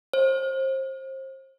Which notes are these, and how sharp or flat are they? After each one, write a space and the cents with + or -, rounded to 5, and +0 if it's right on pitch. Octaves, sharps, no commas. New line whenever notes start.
C5 +30